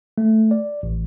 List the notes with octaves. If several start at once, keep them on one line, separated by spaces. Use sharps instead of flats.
A3
D5
A1